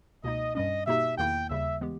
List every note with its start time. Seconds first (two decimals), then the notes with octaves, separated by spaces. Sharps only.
0.24 C#2 B2 A#3 D#4 D#5
0.55 G2 G3 C#4 D#5
0.87 B2 A#3 D#4 G4 E5
1.18 E2 D#3 A#3 E4 G5
1.49 D#2 C#3 G3 E5
1.81 E3 G#3 B3 G4